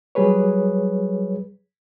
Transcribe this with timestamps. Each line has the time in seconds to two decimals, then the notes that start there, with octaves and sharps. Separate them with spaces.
0.15 F#3 G3 G#4 B4 C#5